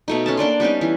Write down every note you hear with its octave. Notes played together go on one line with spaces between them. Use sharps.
B2 A3 D#4
C#4 A4 A5
A#3 D4 D5 C6
G3 B3 C#4 D#4
E3